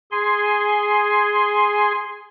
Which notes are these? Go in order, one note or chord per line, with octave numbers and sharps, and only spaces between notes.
G#4 G#5 C6